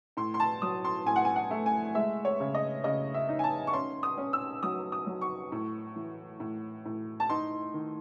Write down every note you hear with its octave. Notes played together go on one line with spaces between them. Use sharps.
A2 C6
C6
A5
F#3 D#6
C6
A2 G#5
F#5
G#5
F#5
A3
G#5
G#3 E5
C#5
C#3
D#5
C#3 D#5
E5
D#4
G#5
A5
C#6
C#4 C6
D#6
C#4
E6
F#3 D#6
D#6
F#3
C#6
A2
E3
A2
A2
A5
D#4 C6
D#3